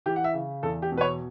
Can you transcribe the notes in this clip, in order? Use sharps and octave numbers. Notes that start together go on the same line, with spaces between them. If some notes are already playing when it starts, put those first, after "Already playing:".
E3 G4
F#5
E5
C#3
E2 A4
G4
B2
B4
C#5